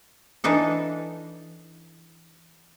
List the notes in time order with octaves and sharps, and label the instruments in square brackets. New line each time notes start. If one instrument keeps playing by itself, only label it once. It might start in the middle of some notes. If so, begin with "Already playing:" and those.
[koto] E3 D4 D#4 A4